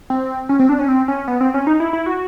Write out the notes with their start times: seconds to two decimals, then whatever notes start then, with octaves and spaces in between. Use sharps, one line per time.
0.10 C4
0.49 C#4
0.59 C4
0.69 D4
0.79 C#4
0.88 C4
1.08 C#4
1.28 B3
1.41 C4
1.54 C#4
1.67 D#4
1.80 E4
1.93 E4
2.06 F#4